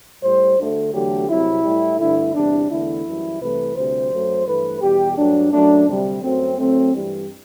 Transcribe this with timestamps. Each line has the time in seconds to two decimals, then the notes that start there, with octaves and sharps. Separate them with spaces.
0.23 A2 G3 C5
0.58 D2 D3 A3
0.94 E2 D3 F#3 A3 G4
1.29 C2 C3 F#3 E4
1.64 A2 G3
1.99 G2 D3 A3 E4
2.34 E2 C3 G3 D4
2.70 E2 D3 A3 E4
3.05 F#2 E3 G3
3.40 C2 C3 E3 A3 B4
3.76 D2 C3 G3 C5
4.12 F#2 F#3 A3
4.46 G2 E3 A3 B4
4.81 E2 B2 G3 G4
5.17 G2 F#3 A3 D4
5.52 F#2 F#3 A3 D4
5.87 D2 C3 G3
6.23 F#2 F#3 A3 C4
6.58 A2 F#3 A3 C4
6.93 G2 E3 G3